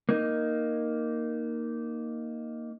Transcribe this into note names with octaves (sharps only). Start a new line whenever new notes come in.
A#3 D#4